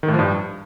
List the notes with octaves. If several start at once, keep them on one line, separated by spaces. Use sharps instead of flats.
D#3
A2
F3
G2